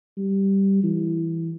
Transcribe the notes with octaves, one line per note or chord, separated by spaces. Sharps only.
G3
E3